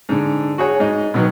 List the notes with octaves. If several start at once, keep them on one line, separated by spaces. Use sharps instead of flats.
G#2 D3
F#4 G#4 C#5
G#2 D#5
B2 D#3 F#3 B3